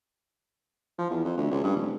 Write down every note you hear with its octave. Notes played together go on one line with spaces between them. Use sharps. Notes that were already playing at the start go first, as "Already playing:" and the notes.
F3
E2
F2
D2
C#2
G2
F1